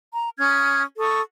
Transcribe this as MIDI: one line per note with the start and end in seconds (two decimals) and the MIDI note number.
0.14 0.30 82
0.39 0.83 61
0.39 0.83 87
0.39 0.83 89
0.39 0.83 92
0.99 1.21 69
0.99 1.21 85
0.99 1.21 87